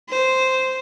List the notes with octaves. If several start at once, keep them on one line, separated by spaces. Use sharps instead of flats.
C5